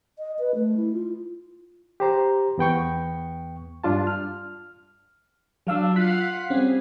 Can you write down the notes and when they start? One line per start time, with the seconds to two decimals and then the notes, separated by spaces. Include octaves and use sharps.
0.19 D#5
0.39 B4
0.55 A3
0.77 E4
0.93 F4
2.00 G4 C5 A#5
2.58 E2 B3 G5 C#6
3.84 G2 D4 F4 A5
4.07 F6
5.67 F#3 D4 F5 E6
5.96 F4 F5 F#5 F#6 B6
6.50 G3 C4 C#4 G#4